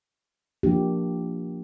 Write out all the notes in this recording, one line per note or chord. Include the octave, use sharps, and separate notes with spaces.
F3 A#3 D4 G4